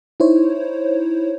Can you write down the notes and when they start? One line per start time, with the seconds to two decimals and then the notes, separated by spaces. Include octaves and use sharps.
0.20 D#4 E4 C5 C#5